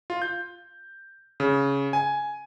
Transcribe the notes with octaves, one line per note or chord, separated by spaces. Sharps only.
F4
G6
C#3
G#5